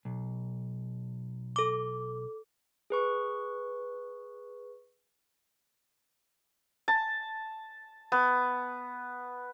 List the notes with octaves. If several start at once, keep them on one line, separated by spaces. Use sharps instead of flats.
B1
A4 D6
G#4 B4 C#6
A5
B3